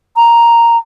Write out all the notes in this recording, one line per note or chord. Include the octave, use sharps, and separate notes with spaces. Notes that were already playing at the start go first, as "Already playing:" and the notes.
A#5